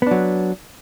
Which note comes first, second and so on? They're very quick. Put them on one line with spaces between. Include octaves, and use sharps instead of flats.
B3 D4 F#3